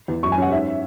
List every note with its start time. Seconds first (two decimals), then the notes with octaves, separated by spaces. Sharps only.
0.08 E2
0.23 F#2 C#6
0.32 G#5
0.38 C#4 F#5
0.52 G#2 E5